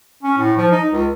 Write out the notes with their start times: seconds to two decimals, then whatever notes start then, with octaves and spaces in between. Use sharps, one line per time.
0.23 C#4
0.38 A2
0.57 F3
0.71 D#4
0.91 C#2